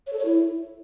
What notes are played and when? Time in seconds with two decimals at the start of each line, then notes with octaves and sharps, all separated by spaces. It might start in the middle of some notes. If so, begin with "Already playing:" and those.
0.07 C#5
0.13 A4
0.19 C#5
0.25 E4